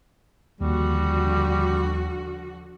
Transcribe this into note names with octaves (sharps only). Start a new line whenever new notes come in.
D#2 D3 F3 G3 F#4